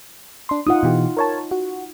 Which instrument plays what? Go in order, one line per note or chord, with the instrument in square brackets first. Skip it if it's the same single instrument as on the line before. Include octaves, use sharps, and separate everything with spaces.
[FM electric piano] D4 C6
[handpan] D#4 F4 F#5 [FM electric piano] D#6
[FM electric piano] B2 E3 G4
A#4 C#5 A5
F#4